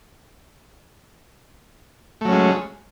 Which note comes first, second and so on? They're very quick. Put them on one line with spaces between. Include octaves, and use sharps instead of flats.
A3 F#3 C#4 G#3